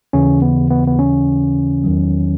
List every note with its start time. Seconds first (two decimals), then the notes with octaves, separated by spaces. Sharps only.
0.13 D#2 C#3 E3 C#4
0.42 B3
0.70 B3
0.87 B3
0.99 C#4
1.84 E2 D#3 F#3